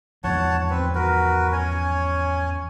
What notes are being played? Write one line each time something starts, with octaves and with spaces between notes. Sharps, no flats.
E2 G#2 F3 C#5 F#5 A5
C4 B4
F#4 A#4 B4
C#4 C#5 G#5